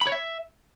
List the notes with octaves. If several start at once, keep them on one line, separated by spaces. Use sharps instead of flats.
B5
C#5
E5